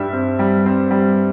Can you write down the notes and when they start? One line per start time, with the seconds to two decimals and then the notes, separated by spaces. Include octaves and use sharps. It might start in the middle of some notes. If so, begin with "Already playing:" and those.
Already playing: G2 G3 E5
0.13 C4
0.39 G3
0.66 C4
0.91 G3